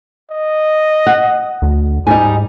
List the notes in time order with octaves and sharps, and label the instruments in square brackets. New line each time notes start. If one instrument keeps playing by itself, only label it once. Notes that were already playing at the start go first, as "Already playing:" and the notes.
[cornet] D#5
[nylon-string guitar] F#5
[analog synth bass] D2
[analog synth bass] G#2 [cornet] G3 [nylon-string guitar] D#4 G#5